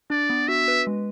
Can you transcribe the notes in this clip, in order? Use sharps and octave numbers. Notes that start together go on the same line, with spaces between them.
D4 D5
B3
F#4 E5
B4
G#3